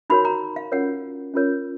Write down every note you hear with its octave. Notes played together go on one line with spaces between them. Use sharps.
D#4 F#4 A#4 C#5 B5
A#5
F5
C#4 F4 A#4 C#5 F#5
C#4 F4 A#4 C#5